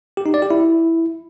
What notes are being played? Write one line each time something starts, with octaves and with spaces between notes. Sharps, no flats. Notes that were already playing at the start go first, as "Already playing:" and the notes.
G4
D#4
D5
G4
E4